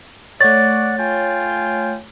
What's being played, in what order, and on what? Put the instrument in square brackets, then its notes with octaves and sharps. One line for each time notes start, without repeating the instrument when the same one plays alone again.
[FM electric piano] A3 C#5 [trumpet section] D5 F#5 [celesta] A6
[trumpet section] F4 G5 G#5